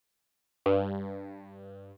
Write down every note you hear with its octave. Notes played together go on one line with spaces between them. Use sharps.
G2